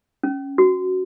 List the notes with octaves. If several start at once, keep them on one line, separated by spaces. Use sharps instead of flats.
C#4
F#4